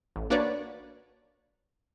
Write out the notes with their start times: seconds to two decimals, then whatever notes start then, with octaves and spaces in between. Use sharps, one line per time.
0.16 A1
0.30 A#3 D4 F#4 B4 C#5 D5